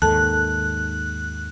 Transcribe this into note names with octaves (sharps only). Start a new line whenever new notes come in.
D#2 G#2 D#3 A4 A5 F#6